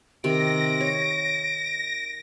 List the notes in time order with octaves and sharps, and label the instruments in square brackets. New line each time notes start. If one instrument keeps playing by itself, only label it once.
[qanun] C3 D#3 [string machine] A#6 [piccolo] D7
[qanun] C#5